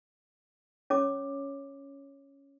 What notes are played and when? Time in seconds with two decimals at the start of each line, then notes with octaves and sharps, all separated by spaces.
0.90 C#4 C#5 D6